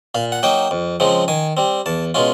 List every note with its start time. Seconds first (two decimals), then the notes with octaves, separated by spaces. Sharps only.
0.15 A#2 F5
0.32 F#5
0.43 F#3 A#3 D#4 G5
0.71 F2
1.00 C#3 F3 G#3 C4
1.28 D#3 G#5
1.57 G3 C4
1.86 E2 A5
2.14 B2 G#3 C#4 F4